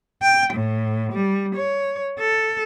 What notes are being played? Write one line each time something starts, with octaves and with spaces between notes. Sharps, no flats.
G5
A2
G3
C#5
A4